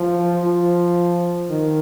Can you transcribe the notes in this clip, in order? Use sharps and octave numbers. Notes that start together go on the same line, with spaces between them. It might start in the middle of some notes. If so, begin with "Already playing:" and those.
Already playing: F3
F3
D#3